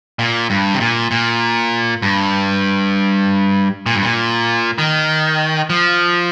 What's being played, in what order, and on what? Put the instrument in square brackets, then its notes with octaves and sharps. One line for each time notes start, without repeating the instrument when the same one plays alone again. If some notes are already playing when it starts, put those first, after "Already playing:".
[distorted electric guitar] A#2
G2
C3
A#2
A#2
G2
A#2
G2
A#2
D#3
F3